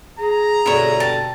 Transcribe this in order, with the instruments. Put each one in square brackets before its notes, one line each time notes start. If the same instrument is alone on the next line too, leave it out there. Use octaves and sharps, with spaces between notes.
[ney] G#4 [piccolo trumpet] A#5
[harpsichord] G2 B2 D3 [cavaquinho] E4 C#5
[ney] G5 [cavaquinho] A5